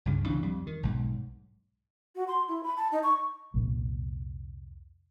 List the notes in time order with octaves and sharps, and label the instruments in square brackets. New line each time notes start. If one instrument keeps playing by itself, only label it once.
[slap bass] C#2 G2 C#3
C2 C#3 E3 D4
F2 G3
D#3
B1 G#2
[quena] F#4
C6
E4
B5
A5
D#4
C#6
[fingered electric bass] C2 F2 A#2 F3